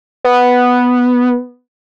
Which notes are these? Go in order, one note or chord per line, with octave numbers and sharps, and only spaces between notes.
B3